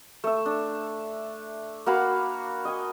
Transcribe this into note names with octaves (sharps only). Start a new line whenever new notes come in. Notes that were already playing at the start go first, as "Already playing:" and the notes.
A3 E5
D4
A#3 F#4 F5 B5
D#5 G#5